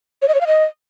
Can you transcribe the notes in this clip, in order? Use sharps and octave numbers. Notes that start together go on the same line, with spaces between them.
C#5
D#5
C#5
F5
D#5